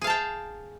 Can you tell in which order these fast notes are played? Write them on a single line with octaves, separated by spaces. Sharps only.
G#4 F5 A5 G5